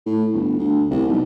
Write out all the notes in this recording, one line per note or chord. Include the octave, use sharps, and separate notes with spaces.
A2
G1
D2
C2
B1